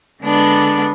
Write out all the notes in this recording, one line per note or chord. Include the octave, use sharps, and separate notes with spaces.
D3 G#3 B3 D4